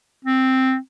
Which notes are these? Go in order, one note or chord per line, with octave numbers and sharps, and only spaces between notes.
C4